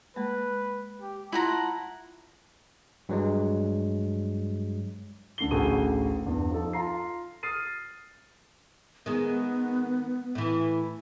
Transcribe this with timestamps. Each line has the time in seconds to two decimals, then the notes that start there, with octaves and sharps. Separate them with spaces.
0.16 G#3 A#3 B4
1.02 G4
1.32 E4 F4 F#5 A5 A#5 C6
3.09 G2 F#3 G#3
5.38 D2 D3 C7 G7
5.51 A1 D2 F#4 G#4 D#7
6.26 E2 G2
6.50 F3 D#4 A4
6.73 F4 A#5 C7
7.43 D#6 F6 A6 C7 D#7
9.06 D#3 G#3 B3
10.35 A2 E3